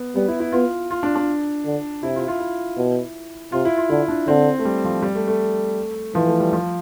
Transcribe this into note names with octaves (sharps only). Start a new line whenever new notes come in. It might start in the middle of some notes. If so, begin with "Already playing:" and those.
Already playing: B3
G3 B3
E4
E4
B3 F4
F4
D4
D4
D3
C3 E4
F4
F4
E4
B2
C3 F4
E4
F4
D3 E4
D4
D3 C4
A3
G3
F3
G3
A3
A3
E3 F3
A3
G3
F3